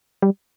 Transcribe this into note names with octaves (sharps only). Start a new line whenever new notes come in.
G3